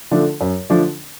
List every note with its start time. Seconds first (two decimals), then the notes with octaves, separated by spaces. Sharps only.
0.11 D3 F3 A3 D4
0.41 F#2
0.70 D3 F3 A3 D4